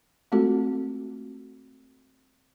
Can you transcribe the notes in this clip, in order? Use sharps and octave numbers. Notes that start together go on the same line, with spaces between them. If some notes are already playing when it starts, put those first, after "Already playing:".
G#3 A3 C4 F4 F#4 A4